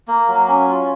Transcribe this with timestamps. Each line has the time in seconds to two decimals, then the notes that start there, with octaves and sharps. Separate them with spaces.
0.08 A#3
0.28 F#3
0.48 C#4
0.69 F4